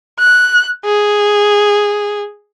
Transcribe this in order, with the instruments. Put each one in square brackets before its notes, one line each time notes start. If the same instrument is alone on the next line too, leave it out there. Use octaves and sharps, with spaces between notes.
[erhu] F#6
G#4